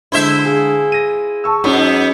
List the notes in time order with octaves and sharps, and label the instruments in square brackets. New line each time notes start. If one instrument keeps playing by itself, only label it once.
[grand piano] D3 G#3 [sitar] E4 C5 E5
[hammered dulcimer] G#4 F5
[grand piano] A#6 D#7
A5 C#6 E6
[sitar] G#2 B3 [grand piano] F#3 C#4 D#4